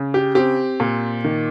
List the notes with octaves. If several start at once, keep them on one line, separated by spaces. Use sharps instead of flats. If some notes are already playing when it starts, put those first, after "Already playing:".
Already playing: C#3
G4
C4 G4
A#2
D#3